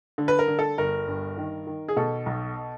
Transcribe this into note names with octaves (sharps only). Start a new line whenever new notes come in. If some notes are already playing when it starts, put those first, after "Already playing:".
D3
B4
A#4
D3
A4
G1 A#4
G2
D#3
D#3
G#4
B2 A4
B1